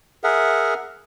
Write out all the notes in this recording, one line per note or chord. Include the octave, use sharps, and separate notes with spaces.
G#4 A#4 E5 F#5